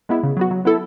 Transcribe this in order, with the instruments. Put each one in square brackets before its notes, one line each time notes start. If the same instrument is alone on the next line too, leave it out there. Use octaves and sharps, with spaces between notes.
[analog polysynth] G#3 B3 E4
C#3
F#3 B3 F#4
F#3
B3 E4 A4